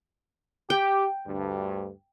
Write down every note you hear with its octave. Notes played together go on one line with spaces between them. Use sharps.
G4 G5
D2 G2